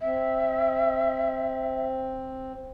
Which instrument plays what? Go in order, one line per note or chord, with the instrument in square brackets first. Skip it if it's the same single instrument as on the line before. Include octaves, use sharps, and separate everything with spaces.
[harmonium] C4 [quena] E5